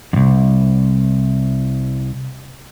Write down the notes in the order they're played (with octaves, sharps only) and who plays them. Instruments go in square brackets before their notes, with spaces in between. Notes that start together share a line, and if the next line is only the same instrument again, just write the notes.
[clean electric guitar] C2 F2